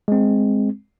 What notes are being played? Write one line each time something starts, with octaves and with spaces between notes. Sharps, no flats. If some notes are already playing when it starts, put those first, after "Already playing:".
G#3 C4